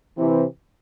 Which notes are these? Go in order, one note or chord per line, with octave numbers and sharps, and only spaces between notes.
C3 E3